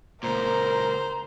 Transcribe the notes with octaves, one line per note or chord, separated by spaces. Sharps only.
C#2 A#2 A#4 C5 A#5